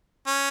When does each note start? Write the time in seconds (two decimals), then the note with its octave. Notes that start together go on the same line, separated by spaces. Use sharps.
0.27 C#4